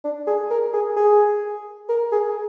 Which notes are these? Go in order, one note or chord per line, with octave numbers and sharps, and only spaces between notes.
D4
G#4
A#4
G#4
G#4
A#4
G#4